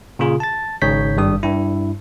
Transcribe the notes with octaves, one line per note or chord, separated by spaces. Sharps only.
A#2 C#3 F4 G#4
A5 A6
G#1 G#2 C#3 C#5 G6 B6
G#1 G2 G3 D#6
G2 E4